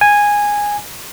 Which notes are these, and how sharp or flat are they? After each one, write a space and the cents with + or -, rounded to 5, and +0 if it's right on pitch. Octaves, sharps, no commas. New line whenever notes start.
G#5 -10